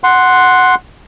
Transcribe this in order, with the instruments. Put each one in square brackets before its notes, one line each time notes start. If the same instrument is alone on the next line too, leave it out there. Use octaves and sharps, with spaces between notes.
[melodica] F#5 C6